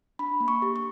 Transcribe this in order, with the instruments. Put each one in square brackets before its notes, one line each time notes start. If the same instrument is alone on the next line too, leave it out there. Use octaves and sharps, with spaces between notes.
[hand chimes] D4 B5
A#3
C#6
G4
C#6